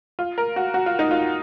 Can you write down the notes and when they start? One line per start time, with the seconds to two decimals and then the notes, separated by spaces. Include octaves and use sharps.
0.19 F4
0.38 A#4
0.56 F#4
0.74 F#4
0.86 F4
0.99 D#4
1.11 F4